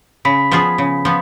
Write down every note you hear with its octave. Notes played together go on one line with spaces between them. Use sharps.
C#3 B5 B6
F3 B3 F4 G#4
C#3
F3 B3